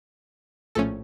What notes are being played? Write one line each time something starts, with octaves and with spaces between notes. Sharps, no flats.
A#1 A2 F3 A3 C#4 A4